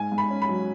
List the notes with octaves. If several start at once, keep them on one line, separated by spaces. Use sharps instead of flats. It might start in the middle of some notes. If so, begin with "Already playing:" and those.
Already playing: G#2 G#5
G#2
B5
C#4
B5
F#3